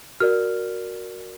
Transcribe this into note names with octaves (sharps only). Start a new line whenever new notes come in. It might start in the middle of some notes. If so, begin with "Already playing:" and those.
F#4 A#4 D5 F6